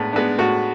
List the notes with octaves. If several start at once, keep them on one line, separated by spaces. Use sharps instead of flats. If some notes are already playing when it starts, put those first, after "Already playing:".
Already playing: A2 G#3 B3 D4
G#3 B3 D4
A2 F#4